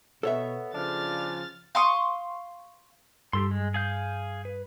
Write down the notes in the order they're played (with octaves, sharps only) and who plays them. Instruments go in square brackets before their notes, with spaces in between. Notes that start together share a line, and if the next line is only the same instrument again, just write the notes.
[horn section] B2 [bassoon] B3 [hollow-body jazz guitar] A4 C#5 E5
[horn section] C#3 F3 [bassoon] D4 [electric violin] F6 A6
[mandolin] F5 C6 C#6 D#6
[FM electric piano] G2 [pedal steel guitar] G4 A4 C6
[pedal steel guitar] G#3
G#4 F5 G6
B4